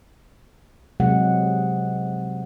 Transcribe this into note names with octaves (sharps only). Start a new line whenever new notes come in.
C3 F#3 G#3 F#5